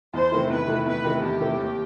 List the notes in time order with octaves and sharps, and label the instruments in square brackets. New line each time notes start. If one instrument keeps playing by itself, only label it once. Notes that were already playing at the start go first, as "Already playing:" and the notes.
[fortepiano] E2 [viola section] C5
[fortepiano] C3 D#3 A3 E4
[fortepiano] E2 [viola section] B4
[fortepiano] C3 D#3 A3 E4
[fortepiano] E2 [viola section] B4
[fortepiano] C3 D#3 A3 E4
[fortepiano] E2 [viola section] G4
[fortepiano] C3 D#3 A3 E4
D#2